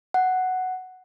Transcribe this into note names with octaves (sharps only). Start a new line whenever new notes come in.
F#5